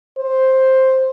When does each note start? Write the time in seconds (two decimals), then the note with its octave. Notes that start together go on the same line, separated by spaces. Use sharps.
0.18 C5